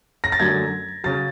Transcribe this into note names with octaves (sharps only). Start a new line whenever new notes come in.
A#6
A6
F#2 D3 F#3 A3 G#6
C#3 F#3 A6